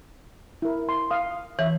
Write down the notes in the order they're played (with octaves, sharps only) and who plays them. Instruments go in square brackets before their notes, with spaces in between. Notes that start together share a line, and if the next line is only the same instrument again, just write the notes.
[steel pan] E4 A#4
C6
F5 D#6
[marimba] E3 [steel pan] C#5 E5